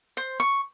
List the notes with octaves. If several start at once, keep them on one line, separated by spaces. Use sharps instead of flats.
C5
C#6